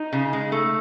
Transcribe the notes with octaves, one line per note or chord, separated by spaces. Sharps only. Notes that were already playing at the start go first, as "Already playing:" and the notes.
Already playing: D#4
C#3
G#3
A3